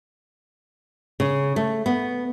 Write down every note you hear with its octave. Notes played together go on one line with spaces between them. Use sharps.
C#3
A3
B3